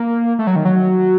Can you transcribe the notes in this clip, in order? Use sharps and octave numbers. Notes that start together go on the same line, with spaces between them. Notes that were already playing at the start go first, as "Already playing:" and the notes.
Already playing: A#3
A3
F#3
D#3
F#3